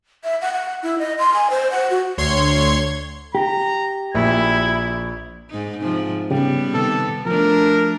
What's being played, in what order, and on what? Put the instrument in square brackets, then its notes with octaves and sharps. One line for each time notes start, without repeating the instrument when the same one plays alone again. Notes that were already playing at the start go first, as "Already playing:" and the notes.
[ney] E5
F#5
F#5
E4
D#5
C6
G#5
C5
F#5
F#4
[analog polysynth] D2 C#5 C6 G#6
[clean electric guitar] G4 [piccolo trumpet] A#5
[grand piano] A#1 [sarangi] E4 [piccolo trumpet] G#6
[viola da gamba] G#2 D#4
G#2 C3 F3
[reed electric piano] C#3 G4 [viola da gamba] G3 B3
[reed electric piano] C3 D#3 [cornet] A4
[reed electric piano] F3 [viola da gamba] A3 D4 [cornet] A#4